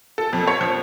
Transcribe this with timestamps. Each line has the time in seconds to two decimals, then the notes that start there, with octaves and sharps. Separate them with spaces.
0.18 A4
0.33 F2
0.47 C#5
0.61 F3